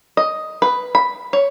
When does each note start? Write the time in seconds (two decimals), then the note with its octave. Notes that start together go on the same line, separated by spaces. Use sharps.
0.17 D#5
0.62 B4
0.95 B5
1.33 C#5